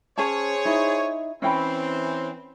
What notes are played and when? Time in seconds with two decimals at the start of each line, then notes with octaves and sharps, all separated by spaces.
0.18 C#4 G#4 C5 C#5 A5
0.65 D#4 E4
1.42 E3 C4 C#4 G5 B5